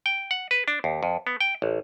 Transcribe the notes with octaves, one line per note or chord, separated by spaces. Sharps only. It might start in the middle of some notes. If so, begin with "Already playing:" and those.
G5
F#5
B4
D4
D#2
F2
B3
G5
A1